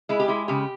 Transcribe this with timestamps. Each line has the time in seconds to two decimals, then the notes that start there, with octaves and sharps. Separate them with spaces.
0.09 G#3 E4
0.20 G4
0.28 G#3 E4
0.48 C#3 G4